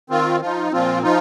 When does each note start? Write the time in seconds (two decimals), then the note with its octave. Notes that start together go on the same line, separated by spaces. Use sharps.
0.10 D#3 C4 F4
0.41 F3 D#4 F4
0.72 A#2 F3 C4 F4
1.03 F3 D#4 F4